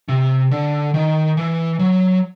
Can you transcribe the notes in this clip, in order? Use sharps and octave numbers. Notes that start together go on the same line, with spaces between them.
C3
D3
D#3
E3
F#3